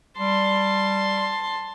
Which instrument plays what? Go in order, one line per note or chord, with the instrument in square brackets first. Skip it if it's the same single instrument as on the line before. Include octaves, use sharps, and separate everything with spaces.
[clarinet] G3 [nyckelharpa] A5 C6